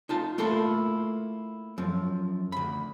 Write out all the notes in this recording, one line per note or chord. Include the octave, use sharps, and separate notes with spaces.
D#4 F4 A5
A3 A#3 E4 F4 A4
F#2 F3
D2 B5